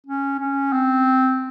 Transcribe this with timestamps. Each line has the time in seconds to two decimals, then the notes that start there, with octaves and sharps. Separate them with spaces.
0.07 C#4
0.40 C#4
0.73 C4